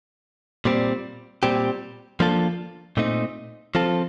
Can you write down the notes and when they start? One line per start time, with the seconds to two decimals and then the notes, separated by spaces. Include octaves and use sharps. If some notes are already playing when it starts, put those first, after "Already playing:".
0.65 A#2 G3 C4
1.43 A#2 G3 C4 G4
2.20 F3 A#3 D4 F4 A4
2.97 A#2 A3 C4 D#4
3.75 F3 C4 F4 A4